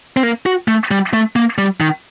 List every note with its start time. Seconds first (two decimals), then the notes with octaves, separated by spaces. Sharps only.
0.17 C4
0.23 A#3
0.46 F#4
0.68 A3
0.91 G3
1.13 A3
1.36 A#3
1.58 G3
1.80 D#3